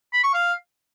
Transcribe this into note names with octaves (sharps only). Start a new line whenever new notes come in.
B5
C#6
F5